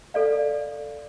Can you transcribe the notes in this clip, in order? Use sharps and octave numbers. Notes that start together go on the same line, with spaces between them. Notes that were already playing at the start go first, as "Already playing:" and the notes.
A4 D5 F5